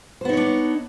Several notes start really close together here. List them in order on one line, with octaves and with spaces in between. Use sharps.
C5 B3 D#4 C#5 D4